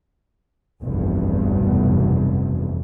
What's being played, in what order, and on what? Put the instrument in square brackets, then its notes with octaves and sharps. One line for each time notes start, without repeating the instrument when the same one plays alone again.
[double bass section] F1 B1 E2 G2